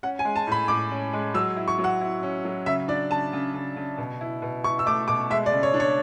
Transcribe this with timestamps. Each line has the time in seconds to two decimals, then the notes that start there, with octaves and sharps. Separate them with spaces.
0.03 C#4 F#5
0.19 G#5
0.25 G#3
0.36 A5
0.47 A2 B5
0.68 A2 D6
0.91 C#4
1.13 G#3
1.34 F#3 E6
1.56 E4
1.68 C#6
1.79 F#3
1.84 F#5
2.01 E4
2.23 C#4
2.45 F#3
2.66 C#3 E5
2.88 D4 D5
3.11 C#3 A5
3.33 C#3
3.54 C#3
3.76 C#3
3.98 B2
4.21 E4
4.42 B2
4.64 E4 C#6
4.79 E6
4.86 A3 D6
5.08 B2 D6
5.30 G#3 E5
5.46 D5
5.52 C#3
5.63 C#5
5.74 D4
5.80 C#5